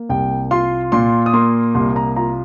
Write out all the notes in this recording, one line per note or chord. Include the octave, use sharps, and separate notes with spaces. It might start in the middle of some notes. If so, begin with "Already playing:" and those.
Already playing: A#3
C2 G5
F4 C6
A#2 C6
D#6
A#3 C6
C2 C6
A#5
F4 A#5